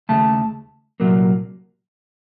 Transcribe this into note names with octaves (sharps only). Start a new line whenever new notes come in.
D#2 C#3 A3 A5
C2 A#2 F#3 A#3